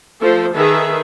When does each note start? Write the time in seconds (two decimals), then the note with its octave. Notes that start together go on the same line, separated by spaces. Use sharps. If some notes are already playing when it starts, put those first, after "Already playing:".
0.21 F3 A3 A4 C5
0.55 D#3 G#4 A4 B4 E5